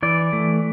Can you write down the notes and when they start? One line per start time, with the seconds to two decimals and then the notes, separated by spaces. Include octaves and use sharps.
0.03 E3 D5
0.33 A3